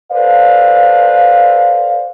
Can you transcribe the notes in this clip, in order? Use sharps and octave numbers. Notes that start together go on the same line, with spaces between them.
A4 B4 C5 D5 F5